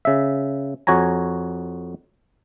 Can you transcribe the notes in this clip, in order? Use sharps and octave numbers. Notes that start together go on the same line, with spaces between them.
C#3 E5
F2 F#4 C#5 G#5 A#5